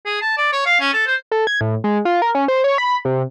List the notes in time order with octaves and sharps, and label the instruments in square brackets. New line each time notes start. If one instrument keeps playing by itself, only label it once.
[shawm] G#4
A5
D5
C#5
F5
C#4
A4
C5
[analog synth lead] A4
G#6
A2
G#3
F4
A#4
C#4
C5
C#5
B5
C3